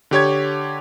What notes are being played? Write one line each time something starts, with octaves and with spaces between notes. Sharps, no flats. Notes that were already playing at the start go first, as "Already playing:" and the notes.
D3 G4 C#5 G#6